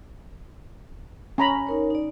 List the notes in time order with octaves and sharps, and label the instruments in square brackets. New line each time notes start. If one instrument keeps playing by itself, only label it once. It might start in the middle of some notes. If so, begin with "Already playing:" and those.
[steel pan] C#4 A#5 B5
[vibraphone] D#4 A#4 C#5
D#4 D5